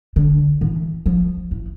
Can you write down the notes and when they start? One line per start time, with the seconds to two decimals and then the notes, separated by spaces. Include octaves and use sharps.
0.16 D3
0.61 E3
1.06 F3
1.51 E3